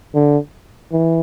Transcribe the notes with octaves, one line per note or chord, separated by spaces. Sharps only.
D3
E3